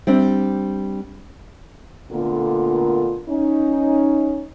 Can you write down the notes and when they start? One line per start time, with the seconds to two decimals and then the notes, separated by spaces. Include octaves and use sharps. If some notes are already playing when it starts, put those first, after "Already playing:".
0.07 G3 C4 D4
2.12 A#2 D3 A3 B3 F4 A#4
3.29 C#4 D#4